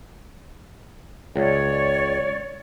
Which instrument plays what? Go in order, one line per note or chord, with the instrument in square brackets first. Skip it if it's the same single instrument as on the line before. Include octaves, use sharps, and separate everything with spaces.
[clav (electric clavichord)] C#2 [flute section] C#5 D5